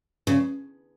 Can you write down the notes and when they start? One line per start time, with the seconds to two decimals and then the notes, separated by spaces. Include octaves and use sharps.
0.27 C#3